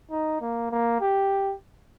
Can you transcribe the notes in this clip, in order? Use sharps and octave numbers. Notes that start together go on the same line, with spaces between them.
D#4
A#3
A#3
G4